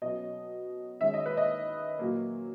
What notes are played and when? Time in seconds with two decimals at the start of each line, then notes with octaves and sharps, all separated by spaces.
0.02 B2 F#3 C#4 D#5
1.01 D#3 G#3 C#4 E5
1.14 D#5
1.26 B4
1.37 D#5
1.99 A#2 F#3 A#3